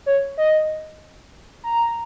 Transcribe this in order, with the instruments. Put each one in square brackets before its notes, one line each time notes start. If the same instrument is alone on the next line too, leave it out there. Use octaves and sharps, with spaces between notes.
[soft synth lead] C#5
D#5
A#5